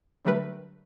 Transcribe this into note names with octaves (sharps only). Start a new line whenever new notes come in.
D3 F#3 G3 A3 A#4 B4